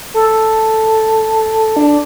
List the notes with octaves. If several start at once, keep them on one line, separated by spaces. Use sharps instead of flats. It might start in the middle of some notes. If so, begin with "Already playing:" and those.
A4
D4